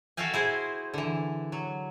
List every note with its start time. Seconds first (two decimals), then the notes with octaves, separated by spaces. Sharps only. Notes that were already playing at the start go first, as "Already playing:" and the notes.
0.17 F#4 A4 E5 F5 G5 G#5
0.34 E4 G#4 C5
0.94 D3 E3
1.52 F#3